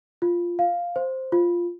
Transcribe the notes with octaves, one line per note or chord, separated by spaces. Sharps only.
F4
F5
C5
F4